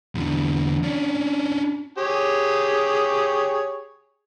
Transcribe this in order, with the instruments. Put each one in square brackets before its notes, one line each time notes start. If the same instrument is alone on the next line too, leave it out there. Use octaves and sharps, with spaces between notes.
[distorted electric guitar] E2 D3
C#4 D4
[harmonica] G4 G#4 C#5